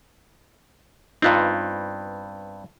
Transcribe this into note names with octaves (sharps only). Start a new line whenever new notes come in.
G2 B3 C4 D#4 F4 F5